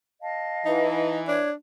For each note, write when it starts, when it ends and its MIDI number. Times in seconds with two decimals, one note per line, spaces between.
0.21 1.17 75
0.21 1.17 77
0.21 1.17 81
0.65 1.38 52
0.65 1.21 63
1.27 1.52 62
1.27 1.48 73